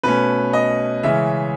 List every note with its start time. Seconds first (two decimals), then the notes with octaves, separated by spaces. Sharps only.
0.03 B2 A3 C#4 B4
0.53 D#5
1.03 C#3 E3 G#3 C#4 E5